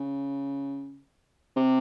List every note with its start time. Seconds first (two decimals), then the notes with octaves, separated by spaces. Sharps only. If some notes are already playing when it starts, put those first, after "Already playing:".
Already playing: C#3
1.56 C3